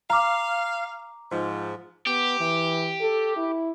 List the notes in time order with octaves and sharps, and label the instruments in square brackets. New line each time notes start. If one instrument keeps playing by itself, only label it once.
[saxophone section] F5 [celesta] A#5 D6
[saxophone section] G#2 F3
[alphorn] B3 [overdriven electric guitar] G4
[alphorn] E3
A4
E4